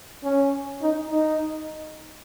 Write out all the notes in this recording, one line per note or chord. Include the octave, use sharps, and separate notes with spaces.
C#4
D#4
D#4